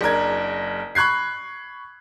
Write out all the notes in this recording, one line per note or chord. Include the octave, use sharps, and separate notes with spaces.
F#1 D4 A#4 G#6
B5 C#6 F#6 G#6 C7